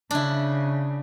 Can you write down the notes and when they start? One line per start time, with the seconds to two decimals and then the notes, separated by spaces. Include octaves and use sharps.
0.11 C#3 D4 E4